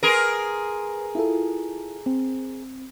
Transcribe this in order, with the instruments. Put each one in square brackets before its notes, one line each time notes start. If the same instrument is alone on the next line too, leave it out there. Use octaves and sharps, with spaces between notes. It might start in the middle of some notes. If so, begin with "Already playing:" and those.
[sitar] G#4 A#4 [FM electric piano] B4 G#5 C6
[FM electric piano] E4 F4 A4
C4